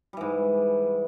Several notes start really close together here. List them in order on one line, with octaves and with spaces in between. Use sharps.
G3 E3 G#2